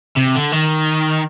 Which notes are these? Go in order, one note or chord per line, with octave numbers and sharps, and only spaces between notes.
C3
D3
D#3